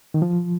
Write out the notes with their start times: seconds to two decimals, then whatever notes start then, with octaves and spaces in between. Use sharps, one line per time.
0.14 D#3
0.22 F3